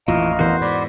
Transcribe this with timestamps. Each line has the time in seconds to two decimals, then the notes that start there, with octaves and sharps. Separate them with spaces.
0.08 A1 F2 A#2 E3 D#5 F5 A#5
0.39 E2 F#4 A#4 C5
0.61 G#2 D5 B5